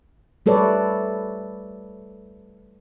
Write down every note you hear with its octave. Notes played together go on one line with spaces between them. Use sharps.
G3 A3 A4 B4 C#5 D5